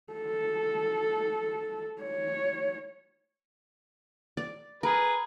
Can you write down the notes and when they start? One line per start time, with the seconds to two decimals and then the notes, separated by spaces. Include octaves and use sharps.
0.13 A4
2.02 C#5
4.37 D5 D6
4.83 G#4 A#4 B4